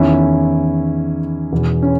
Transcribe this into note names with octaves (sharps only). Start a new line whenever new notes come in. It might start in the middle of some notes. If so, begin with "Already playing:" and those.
Already playing: E2 D#3 C#4 E4
E2 B2
C#4